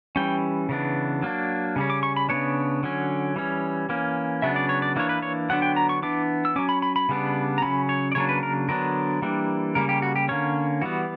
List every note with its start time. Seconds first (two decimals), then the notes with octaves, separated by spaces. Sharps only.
0.16 E3 G3 C#4 G5
0.69 C#3 E3 B3 D4
1.22 F#3 A#3 D4
1.76 C#3 G3 C#4
1.90 D6
2.03 C#6
2.17 B5
2.29 C#3 G3 B3 D4 C#5
2.83 D3 F#3 C#4
3.36 E3 G3 C#4
3.89 E3 A#3 C#4
4.42 C#3 F#3 B3 D4 E5
4.56 D5
4.69 C#5
4.82 D5
4.96 E3 A#3 D4 C#5
5.09 B4
5.22 C#5
5.49 D3 F#3 B3 D4 F#5
5.62 G5
5.76 A#5
5.89 C#6
6.03 E3 B3 D4 D6
6.45 E6
6.56 F#3 C#4 D6
6.69 B5
6.82 B5
6.96 B5
7.09 C#3 G3 B3 D4
7.58 A#5
7.62 C#3 F#3 C#4 B5
7.89 C#5
8.12 D5
8.15 C#3 F#3 A#3 D4 C#5
8.29 B4
8.43 A#4
8.69 D3 F#3 B3 D4 A#4
9.22 E3 G3 A#3 D4
9.75 C#3 G3 A#3 A#4
9.89 G4
10.02 F#4
10.16 G4
10.28 D3 A#3 C#4 C#5
10.82 E3 G3 B3 F#4